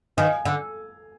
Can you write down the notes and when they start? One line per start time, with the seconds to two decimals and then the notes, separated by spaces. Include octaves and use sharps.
0.17 D#3 F5 G#5
0.45 D3